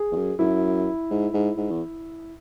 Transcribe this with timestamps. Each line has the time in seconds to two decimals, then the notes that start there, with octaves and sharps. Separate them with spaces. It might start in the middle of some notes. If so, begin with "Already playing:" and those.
Already playing: G#4
0.12 E2
0.16 F#2
0.39 F#2 E4
1.11 G#2
1.34 G#2
1.57 G#2
1.70 E2